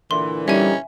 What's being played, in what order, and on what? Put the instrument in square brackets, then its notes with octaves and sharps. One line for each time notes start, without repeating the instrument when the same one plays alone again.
[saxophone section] A#2 D3 E3 [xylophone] C6
[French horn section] G3 D#4 [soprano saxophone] C#4 [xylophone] E5 G#5